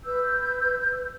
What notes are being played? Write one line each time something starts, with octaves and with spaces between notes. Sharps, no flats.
B4 E6 G6